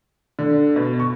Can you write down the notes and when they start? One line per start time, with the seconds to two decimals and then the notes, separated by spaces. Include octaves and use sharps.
0.39 D3
0.76 B2
1.00 C#6